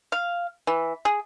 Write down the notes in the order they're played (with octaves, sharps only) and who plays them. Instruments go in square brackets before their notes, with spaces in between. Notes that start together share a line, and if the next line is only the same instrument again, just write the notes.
[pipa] F5
E3
G#4